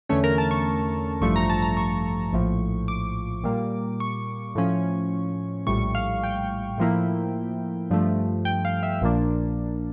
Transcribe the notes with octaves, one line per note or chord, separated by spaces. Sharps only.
E2 D3 A3 C#4 C#5
A#4
A5
C#6
A1 G2 F3 A3 C#6
A#5
A5
A#5
C#6
A#1 A2 F3
D6
A#2 G3 A#3
C#6
A2 F3 C#4
A#1 A2 G3 C#6
F5
G5
A2 F3 A#3 E4
G2 F3 A3
G5
F5
E5
A#1 A#2 F3 A#3 D4